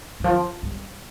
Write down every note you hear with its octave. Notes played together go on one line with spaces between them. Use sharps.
D#3
F3
G3